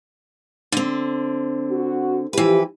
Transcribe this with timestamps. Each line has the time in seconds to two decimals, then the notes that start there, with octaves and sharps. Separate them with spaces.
0.72 D3 C4
1.70 F#4
2.33 E3 F3 E4 G4 B4